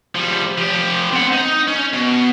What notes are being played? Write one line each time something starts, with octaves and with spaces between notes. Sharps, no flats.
F3 G3
F3 G4
C4 F#5
D#4
C#4
B2